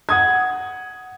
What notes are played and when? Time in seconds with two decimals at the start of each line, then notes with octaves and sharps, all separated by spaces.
0.09 F#5 D#6 G#6